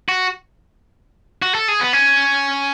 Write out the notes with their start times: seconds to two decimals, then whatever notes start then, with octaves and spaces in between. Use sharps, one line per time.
0.09 F#4
1.42 F#4
1.55 A4
1.68 G#4
1.81 B3
1.93 C#4